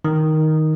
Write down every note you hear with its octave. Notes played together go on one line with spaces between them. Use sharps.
D#3